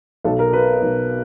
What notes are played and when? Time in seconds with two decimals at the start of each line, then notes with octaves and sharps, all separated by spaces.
0.24 B1 A4
0.39 A#4
0.53 B2 B4
0.82 B1